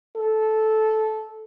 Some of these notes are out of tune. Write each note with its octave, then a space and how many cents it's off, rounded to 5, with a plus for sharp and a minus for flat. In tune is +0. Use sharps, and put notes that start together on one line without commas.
A4 -15